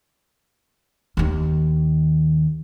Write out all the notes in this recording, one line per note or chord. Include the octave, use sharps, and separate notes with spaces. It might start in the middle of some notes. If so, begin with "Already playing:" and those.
D#2 D#3